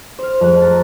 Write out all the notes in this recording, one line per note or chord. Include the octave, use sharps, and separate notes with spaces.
C5 F6
F2 A3 G#4 F#6
A5 A#5